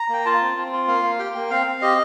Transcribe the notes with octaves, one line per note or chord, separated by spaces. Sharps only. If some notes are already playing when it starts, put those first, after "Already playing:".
Already playing: A#5
A#3 G5
F4 A5
C4
C4
F4
A#3 F5
A#3
G4 G5
A#3
C4 F5
C4
G4 D#5